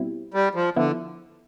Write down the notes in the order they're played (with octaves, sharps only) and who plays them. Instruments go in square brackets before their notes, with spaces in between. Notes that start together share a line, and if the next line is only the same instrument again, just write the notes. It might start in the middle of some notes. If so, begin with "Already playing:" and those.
Already playing: [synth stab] B2 G3 C4 E4
[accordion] G3
F3
[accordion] D3 [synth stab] F3 B3 E4